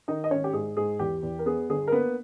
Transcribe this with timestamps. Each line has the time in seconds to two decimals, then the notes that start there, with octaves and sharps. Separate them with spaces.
0.08 D#3 D#4 D#5
0.24 D#5
0.31 G#1 C#4 C#5
0.44 G4
0.53 G#2 G#4
0.77 G#2 G#4
0.99 E2 G4
1.23 E2
1.39 A#4
1.46 B3 G#4
1.70 G1 G#4
1.88 A#4
1.92 A#3 B3 B4